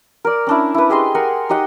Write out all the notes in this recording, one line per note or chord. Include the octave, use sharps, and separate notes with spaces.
A#4 D5
C#4 D4 E4
E4 B4
G4 G#4 D#5 C6
A#4 F#5 G#5
D#4 G4 D#5 F#5